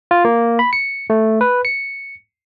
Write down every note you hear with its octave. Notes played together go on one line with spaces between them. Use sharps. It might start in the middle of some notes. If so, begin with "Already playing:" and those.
F4
A#3
B5
C#7
A3
B4
C#7